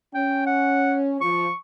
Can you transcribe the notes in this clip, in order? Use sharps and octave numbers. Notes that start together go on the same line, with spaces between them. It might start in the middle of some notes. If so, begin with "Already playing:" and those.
C#4 G5
F#5
F3 C#6